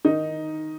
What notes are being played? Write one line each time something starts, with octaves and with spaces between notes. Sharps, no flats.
D#3 D#4